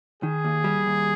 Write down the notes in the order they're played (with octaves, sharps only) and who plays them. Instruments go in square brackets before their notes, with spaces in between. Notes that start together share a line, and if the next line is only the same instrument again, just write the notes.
[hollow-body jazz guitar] D#3 [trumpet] G#4
[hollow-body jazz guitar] D#2
G3
D#2